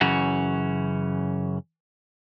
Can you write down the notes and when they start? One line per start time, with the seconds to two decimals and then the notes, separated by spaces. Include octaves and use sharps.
0.01 F#2 C#3 E3 C#4 F#4